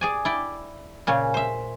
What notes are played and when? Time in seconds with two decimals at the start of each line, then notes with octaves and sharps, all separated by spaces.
0.01 G#4 D5 G#5
0.25 E4 D5 G5
1.07 A#2 C#3 C#4
1.34 C5 E5